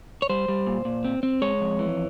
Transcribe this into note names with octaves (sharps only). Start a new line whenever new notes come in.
C#5
G3 C5
G3
A#2
A#2
C4
C4
G#3 C#5
F2
E3